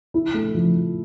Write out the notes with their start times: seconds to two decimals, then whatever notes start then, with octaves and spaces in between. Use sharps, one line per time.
0.14 E4
0.34 A3
0.55 F3